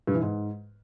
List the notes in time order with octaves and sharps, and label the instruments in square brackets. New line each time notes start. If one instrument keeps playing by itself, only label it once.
[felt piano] G2
E3
G#2